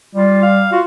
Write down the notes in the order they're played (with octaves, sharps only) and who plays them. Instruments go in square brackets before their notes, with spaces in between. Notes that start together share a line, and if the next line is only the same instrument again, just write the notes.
[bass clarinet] G3 [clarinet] F4
[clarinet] F5
[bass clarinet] F4 [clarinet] F#4